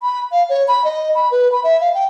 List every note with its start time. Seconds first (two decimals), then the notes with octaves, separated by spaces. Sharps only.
0.03 B5
0.32 F5
0.49 C#5
0.68 B5
0.84 D#5
1.15 B5
1.31 B4
1.52 B5
1.64 E5
1.81 F5
1.95 G5